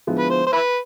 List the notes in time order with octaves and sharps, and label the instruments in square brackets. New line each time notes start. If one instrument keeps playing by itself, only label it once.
[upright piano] D3 F3 G#3 B3 E4
[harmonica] B4
C5
C5
E4 B4